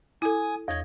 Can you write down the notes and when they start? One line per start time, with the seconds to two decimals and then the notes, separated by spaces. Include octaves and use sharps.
0.22 E4 A4 G#5 D#6
0.68 E2 C#5 D#5 G#6